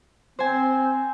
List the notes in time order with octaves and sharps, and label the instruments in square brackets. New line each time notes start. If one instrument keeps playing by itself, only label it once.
[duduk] C4 [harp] C5 G#5